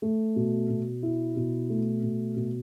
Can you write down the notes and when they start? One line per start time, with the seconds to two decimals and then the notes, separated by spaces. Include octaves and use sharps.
0.02 A3
0.36 B2
0.69 B2
1.03 E4
1.36 B2
1.70 A3
2.03 B2
2.36 B2